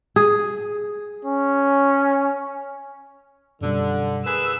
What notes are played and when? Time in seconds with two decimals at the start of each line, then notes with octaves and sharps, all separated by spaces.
0.16 G#4
1.25 C#4
3.61 F#2 B2 D3 G3
4.25 G#4 A#4 B4 E6